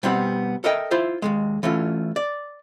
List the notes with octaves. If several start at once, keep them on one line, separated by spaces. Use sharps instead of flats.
B2 G3 B3 C4 G4 F#5
A4 A#4 D#5 E5 G5
E4 F4 C5 E5
D#2 C3 G#3
E3 A3 C#4 F4
D5